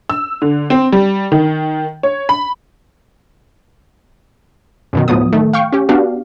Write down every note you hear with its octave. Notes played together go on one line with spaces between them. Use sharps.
E6
D3
C4
G3
D#3
C#5
B5
F#2 B2 D#3
D2 A2 F3 F#3 B3 D#6
D#3 A3
F5 G5 C#6
C#4 G4
B3 D4 F#4 G4 F5